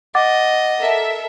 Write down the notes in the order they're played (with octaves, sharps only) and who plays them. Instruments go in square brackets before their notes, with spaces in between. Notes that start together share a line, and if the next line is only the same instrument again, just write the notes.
[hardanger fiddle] D#5 [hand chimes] F#5 D6 A6
[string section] A4 A#4 E5